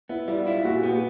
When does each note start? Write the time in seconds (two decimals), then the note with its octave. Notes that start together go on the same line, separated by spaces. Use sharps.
0.09 B3 E4
0.28 G3 E4
0.46 E4 F4
0.64 A#2 F#4
0.82 B3 G4